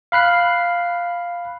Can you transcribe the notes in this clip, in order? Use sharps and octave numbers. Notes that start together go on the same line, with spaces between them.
F5 B5 F#6 C7